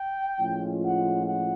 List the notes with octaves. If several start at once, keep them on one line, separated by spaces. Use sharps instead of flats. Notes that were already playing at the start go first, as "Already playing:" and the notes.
Already playing: G5
A2 F3 G#3 C#4 F4
F#5
F#5